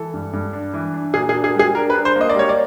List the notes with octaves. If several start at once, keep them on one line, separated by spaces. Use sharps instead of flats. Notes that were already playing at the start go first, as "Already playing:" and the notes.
Already playing: E3 A4
G2
G2
D4
E3
D4
A#2 G#4
G#4
D4
G#4
G3 G#4
D4 A#4
B4
D4
C5
A#3
D#5
D5
G3 C#5
D5